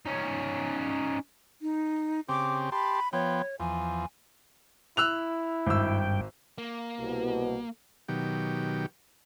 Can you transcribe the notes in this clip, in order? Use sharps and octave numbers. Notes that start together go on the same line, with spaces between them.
C#4 D#4
D#4
C#3 C4 G4 D6
G4 A5 B5 C6
F3 B3 C#5 G5
E2 F3 G#5
E4 E6 F#6 F7
G#1 G2 G5 E6
A#3
C2 B2
B2 D#3 F#3 G4